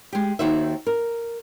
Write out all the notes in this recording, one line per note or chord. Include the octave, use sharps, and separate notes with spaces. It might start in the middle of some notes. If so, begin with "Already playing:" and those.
G#3 G4
D#2 D#3 F#4 C5 E5
A#4